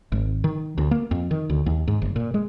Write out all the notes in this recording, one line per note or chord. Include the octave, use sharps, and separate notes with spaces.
G#1
D#3
D2
A#3
F2
D#3
D2
D#2
G#2
F#1
A#2
G#3